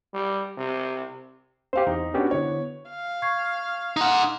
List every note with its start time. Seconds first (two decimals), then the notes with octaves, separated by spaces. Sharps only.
0.14 G3
0.58 C3
1.73 C4 G4 C5 F5
1.87 E2 D#4
2.14 B3 C#4 D4 F#4 G4
2.31 D3 B3 E4 C#5
2.89 F5
3.22 C#6 G#6 C7
3.97 D#4 F#5 A#5 C6